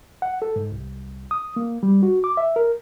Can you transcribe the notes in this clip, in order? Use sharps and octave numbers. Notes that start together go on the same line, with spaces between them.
F#5
A4
G#2
C2
D#6
A#3
G3
F#4
D6
E5
A#4